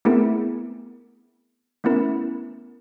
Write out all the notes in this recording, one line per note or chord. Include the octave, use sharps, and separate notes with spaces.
A3 B3 C4 E4 G#4 A#4
A3 B3 C#4 E4 A#4